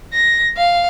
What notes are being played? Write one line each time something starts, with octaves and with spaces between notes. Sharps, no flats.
A#6
F5